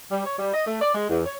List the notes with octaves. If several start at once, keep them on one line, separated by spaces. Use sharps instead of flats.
G3
C#5
G3
D#5
A3
D5
G#3
E2
C#5